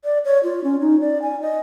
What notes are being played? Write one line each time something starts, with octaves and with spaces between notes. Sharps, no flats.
D5
C#5
F4
C#4
D#4
D5
G#5
D#5